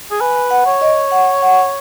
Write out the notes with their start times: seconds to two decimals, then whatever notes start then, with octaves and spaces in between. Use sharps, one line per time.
0.11 G#4
0.20 B4 G#5
0.51 F#5
0.66 C#5
0.81 D#5
1.11 F#5
1.42 F#5